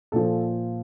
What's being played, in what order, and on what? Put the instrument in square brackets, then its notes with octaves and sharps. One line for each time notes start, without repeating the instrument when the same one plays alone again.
[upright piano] A#2 F3 A4